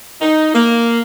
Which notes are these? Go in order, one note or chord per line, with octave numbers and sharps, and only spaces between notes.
D#4
A#3